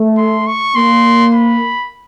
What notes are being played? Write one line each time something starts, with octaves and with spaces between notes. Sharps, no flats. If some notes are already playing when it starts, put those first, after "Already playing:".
Already playing: A3
C6
C#6
A#3 C6
B5